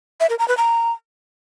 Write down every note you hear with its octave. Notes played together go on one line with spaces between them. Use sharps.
E5
A#4
A#5
B4
A#5